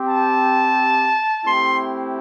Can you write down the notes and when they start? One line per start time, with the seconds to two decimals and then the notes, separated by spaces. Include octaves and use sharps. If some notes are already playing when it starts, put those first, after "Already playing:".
Already playing: C4 G4
0.09 A5
1.45 A3 C4 E4 G4 C6